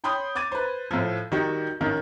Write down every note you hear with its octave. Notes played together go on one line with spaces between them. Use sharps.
C#5 G5 B5 C6 D#6 G6
D6 G#6 A6 D#7
B4 C5
A2 F3
D#3 G3 D#4 F#4 G4
A1 D#3 A#4